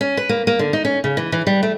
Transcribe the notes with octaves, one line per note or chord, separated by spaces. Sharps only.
C#4
B4
A#3
A#3
D3
D#4
C#4
C#3
E3
E3
G3
A3